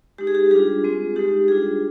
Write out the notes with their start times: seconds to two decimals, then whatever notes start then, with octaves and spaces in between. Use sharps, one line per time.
0.18 G#3 D#4 G4
0.27 G#4
0.35 G4
0.51 G3 D4 F4 G#4
0.84 G#3 C4 F4
1.16 G#3 D#4 G4
1.48 G3 D4 F4 G#4